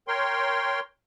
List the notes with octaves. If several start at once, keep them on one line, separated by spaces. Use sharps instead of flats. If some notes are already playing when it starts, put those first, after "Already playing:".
A#4 C#5 G5 C6